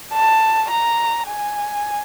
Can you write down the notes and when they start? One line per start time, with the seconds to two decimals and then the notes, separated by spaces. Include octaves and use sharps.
0.13 A5
0.70 A#5
1.28 G#5